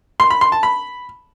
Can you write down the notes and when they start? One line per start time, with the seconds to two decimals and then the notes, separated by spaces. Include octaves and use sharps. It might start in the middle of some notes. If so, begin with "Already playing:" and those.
0.20 C6
0.30 B5
0.41 C6
0.52 A5
0.63 B5